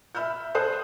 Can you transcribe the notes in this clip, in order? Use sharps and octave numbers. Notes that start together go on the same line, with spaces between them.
E5 B5 E6 F6 G6
C5 A5 D#6 F#6